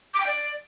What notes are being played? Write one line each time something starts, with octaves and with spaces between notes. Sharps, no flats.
D6
G5
D5